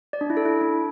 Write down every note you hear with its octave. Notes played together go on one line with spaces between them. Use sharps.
D5
D4
E4
A4
E4
D4